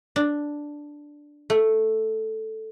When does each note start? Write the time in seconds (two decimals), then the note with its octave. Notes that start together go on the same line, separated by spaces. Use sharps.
0.16 D4
1.50 A3